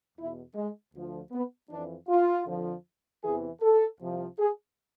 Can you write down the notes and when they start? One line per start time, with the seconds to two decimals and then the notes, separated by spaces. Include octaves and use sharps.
0.17 E2 B2 E4
0.55 G#3
0.94 D2 D3 F3
1.31 B3
1.69 F2 E3 D4
2.08 F4
2.46 F2 D3 F3
3.22 E2 C3 E3 G#4
3.61 A4
3.98 C2 C3 F3
4.37 G#4